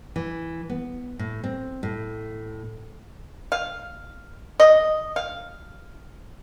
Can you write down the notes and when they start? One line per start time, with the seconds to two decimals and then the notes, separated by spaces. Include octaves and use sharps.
0.16 E3
0.70 B3
1.19 A2
1.44 C4
1.83 A2
3.52 F5
4.60 D#5
5.16 F5